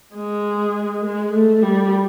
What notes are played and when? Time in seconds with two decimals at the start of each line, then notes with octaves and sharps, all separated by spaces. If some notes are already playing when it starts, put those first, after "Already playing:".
0.15 G#3
1.04 G#3
1.33 A3
1.63 G3